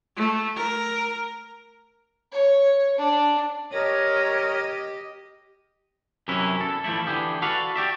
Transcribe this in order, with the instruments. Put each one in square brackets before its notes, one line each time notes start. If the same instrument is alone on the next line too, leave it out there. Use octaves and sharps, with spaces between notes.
[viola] A3
A#4
[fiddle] C#5
D4
[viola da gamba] G4 D#5 [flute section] A#4 C#5
[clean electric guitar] F#2 C3 E3 C#4 E4
E2 A4
E3 F3 G3 A3 E4
D3 E3 G4 G#4
F#4 A4 B4 D5 F5
F#4 G4 D5 E5